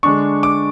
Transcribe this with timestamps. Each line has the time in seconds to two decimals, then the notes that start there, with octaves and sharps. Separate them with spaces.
0.03 D3 G#3 D4 C#6
0.43 D6